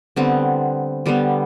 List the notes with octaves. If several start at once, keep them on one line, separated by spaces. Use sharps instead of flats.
D3 G3 B3 C4
D3 G3 B3